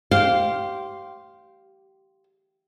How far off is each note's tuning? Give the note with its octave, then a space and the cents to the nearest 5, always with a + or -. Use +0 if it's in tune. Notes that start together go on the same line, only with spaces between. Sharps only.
G4 -20 C5 +0 F5 +0